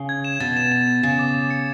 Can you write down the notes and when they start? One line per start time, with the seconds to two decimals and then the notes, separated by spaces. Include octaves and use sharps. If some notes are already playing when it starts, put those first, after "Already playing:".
Already playing: C#3
0.09 G#6
0.24 E7
0.40 B2 A6
0.57 E7
0.72 E7
0.88 E7
1.03 C#3 A6
1.19 D6
1.35 E7
1.50 C#7